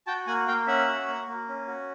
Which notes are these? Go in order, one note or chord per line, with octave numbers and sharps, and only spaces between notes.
F#4 G5 A5
A#3 F#5 G#5
A#3 F5 G5
C#4 E5 F#5
F#4
A#3
A#3
C#4
F#4